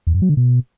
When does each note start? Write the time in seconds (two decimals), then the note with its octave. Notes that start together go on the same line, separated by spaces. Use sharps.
0.07 E2
0.14 F#2
0.22 F#3
0.29 D3
0.37 B2